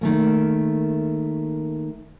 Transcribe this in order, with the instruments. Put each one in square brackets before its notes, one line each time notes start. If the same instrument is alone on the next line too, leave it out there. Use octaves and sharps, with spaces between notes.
[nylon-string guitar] D#3 A3 A#3